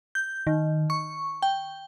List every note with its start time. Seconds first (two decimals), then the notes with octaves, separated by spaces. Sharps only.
0.15 G6
0.47 D#3
0.90 C#6
1.42 G5